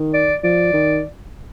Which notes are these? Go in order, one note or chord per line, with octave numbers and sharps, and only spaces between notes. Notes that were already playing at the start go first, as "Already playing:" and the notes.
Already playing: D#3
D5
F3 D5
D#3